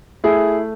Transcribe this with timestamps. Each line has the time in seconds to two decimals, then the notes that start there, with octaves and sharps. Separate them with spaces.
0.24 A3 E4 G#4